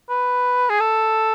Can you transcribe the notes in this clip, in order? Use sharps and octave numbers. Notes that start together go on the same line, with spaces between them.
B4
G#4
A4